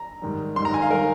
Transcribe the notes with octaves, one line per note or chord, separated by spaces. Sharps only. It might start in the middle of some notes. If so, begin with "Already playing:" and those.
Already playing: A#5
G#2 D#3 G3
G#2 D#3 G3 C6
A#5
G#5
F5
D#3 G3 A#4